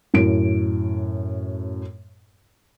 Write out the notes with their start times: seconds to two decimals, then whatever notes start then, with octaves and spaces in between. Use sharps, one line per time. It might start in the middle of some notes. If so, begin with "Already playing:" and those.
0.14 F#2 A2 D7